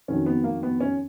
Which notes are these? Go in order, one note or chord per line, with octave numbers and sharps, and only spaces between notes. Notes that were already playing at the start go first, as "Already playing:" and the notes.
F2 D#3 F#3 C#4
B3
A#3
B3
C#4